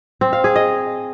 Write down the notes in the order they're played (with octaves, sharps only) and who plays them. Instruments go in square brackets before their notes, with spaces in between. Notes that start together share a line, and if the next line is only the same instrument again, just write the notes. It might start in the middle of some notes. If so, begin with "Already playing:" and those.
[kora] C4
F5
G#4
D#5